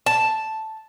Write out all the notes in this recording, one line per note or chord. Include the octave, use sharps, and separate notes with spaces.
A5